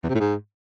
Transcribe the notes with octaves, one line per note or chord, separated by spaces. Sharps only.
E2
C3
A2
G#2